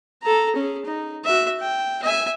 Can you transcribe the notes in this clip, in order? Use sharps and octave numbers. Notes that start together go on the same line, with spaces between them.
A4 A#5
C#4 G#4
D#4
F#4 E5
G5
E5 G#5